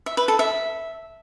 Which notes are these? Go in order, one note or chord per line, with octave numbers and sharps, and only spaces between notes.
E5
B4
A4
E5